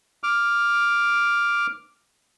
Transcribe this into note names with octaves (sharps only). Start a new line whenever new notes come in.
D6 F6